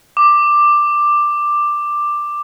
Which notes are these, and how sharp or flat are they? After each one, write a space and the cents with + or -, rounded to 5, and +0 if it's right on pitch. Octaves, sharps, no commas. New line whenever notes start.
D6 +10